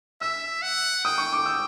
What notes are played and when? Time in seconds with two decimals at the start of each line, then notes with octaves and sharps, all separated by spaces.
0.21 E5 E6
0.63 F#5
1.05 G5 D#6
1.18 C#6
1.33 D6
1.46 E6